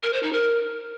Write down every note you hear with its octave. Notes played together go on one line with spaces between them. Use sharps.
A#4
C5
D#4
A#4